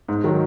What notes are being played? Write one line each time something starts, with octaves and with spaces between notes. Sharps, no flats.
G#2
D#3 F#3